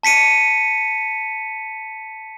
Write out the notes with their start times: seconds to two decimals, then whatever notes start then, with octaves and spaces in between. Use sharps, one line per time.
0.03 A5 B6 C#7 D#7